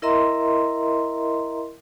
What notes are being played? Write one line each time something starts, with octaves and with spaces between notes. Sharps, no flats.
E4 A#4 D#5 E5 A#5 C6